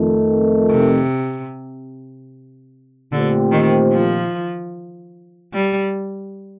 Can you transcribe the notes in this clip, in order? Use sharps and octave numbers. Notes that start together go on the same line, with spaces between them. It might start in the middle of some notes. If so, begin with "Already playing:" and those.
Already playing: F2 D#3 A3
C3
A#2 D3 A3 C4 G4 C5
D#3
F3
G3